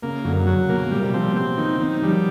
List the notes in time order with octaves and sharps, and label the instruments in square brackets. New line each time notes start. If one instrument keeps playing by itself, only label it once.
[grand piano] C#3 [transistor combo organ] A#3
[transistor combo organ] F#2 [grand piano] D3
[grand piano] C#3 [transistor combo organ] F#3
[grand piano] B2 [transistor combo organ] A#3
[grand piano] A#2 [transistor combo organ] G3
[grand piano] C3
[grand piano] F3 [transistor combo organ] C4
[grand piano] F#3
[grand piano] B3 [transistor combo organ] C4
[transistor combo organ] D#3 [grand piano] B3
[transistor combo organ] D#3 [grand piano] F#3
[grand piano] F#3
[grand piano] F3 [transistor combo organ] G3